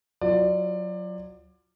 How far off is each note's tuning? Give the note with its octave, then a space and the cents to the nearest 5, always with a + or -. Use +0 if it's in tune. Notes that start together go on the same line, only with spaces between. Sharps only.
F#3 -15 F4 -20 D5 +20